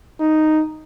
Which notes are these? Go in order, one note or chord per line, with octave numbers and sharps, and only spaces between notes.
D#4